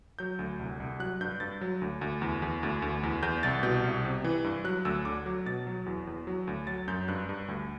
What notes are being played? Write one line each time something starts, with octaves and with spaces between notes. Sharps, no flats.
F#3 G6
D2
C2
C2
F#3 F#6
G2 G6
G2 A6
F#3
D2
D2
E2
E2
D2
D2
E2
E2 G6
C2 A6
B2 G6
C2
C3
E3
G2
F#3 F#6
D2 E6
D3 D6
F#3
B2 A6
F#3
E2
E2
F#3
D2
F#3 A6
F#2 G6
G2 F#6
G2
D2